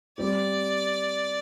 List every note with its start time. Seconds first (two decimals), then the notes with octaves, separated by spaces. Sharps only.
0.18 G3 C4 G4 D5